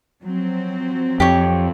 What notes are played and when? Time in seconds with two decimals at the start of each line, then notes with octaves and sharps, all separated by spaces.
0.23 F3 F#3 C4
1.20 F2 G4 C#5